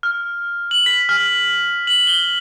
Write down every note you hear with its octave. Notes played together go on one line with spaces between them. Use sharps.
F6
F#7
B6
F6
F#7
G7